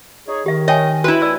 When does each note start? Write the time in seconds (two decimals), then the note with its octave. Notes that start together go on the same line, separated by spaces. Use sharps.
0.28 D#4 G#4 C#5
0.46 D#3 G4 E5
0.68 C#5 D#5 G5 G#5
1.04 E4 F#4 B4
1.22 D5 E6